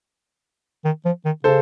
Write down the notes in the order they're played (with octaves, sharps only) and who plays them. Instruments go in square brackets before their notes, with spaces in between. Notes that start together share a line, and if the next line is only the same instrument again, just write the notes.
[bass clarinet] D#3
F3
D#3
[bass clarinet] C#3 [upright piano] A4 C5